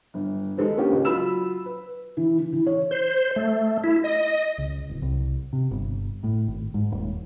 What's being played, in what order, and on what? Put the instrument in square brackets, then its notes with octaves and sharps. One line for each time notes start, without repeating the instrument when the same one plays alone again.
[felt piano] G1
G#3 D#4 A4 B4 C5
A#3 C#4 D4 G4
C#2
F#3 F4 B5 E6 E7
B4
E3
E3
E3
C#5
[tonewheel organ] C5
A3
E4
D#5
[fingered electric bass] C#2
D1
C2
C3
G1
A2
G#1
G#2
D#1